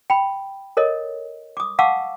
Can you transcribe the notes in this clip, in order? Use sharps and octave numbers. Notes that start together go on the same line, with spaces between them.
G5 B5
A4 A#4 C#5 D#5
D6 D#6
F5 F#5 A5 C#6 D6 E6